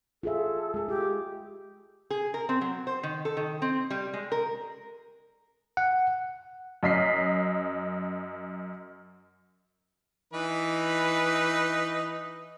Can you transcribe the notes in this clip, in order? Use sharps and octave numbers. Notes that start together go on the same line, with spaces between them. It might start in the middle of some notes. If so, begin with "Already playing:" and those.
F4 G#4 A4 E5
G#3 G#4
F4 G4
G#4
A#4
C4
F#3
C5
D#3
A4
D#3
C4
G3
G#3
A#4
F#5
F#2 D#5 B6 C7
E3 D#4 B4